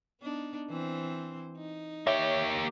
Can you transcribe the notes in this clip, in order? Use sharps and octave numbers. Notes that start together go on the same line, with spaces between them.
B3 D4 D#4
E3 C4 C5
D#4
A#3 G4 C#5 E5